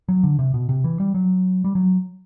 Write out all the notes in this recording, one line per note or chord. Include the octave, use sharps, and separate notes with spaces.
F#3
D3
C3
B2
C3
E3
G3
F#3
G3
F#3